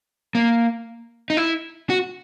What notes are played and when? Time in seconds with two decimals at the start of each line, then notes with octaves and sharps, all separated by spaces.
0.35 A#3
1.30 D#4
1.37 E4
1.90 F#4